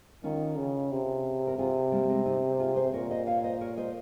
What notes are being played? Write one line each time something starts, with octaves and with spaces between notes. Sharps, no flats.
D#3 C#4 F4
C#3
C3
A#4
C3 F4 G#4
G3 A#3
G#3 C4
C4 D#4
F4 G#4
G#4 C5
A#2 A#4 C#5
C5 D#5
C#5 F5
C5 D#5
A#4 C#5
C5 D#5